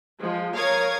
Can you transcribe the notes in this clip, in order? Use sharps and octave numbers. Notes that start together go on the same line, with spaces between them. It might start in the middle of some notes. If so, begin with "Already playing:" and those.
F3 G#3
A#4 C#5 F5 D#6 G#6